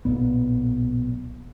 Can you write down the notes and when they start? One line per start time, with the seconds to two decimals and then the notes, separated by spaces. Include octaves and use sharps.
0.05 B1 A#2 B3